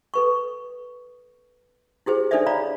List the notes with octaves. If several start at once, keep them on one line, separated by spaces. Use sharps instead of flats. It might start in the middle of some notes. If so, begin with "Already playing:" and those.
A4 B4 C#6
E4 G4 G#4 C5
D4 D#4 A4 C5 D5 E5
C#5 D5 F5 A#5 B5